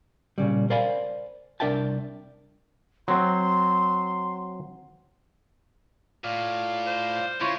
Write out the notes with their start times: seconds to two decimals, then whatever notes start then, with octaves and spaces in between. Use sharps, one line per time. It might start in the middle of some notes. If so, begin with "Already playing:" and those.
0.38 A#2 C#3 G3
0.70 A#4 C5 D5 F5 G#5 B5
1.60 C2 D4 A#4 E5 G5 A5
3.08 F#3 C4 C6
6.24 A2 F4 D5 F5
6.87 C5
7.41 C#3 G#3 E4 F4 C#5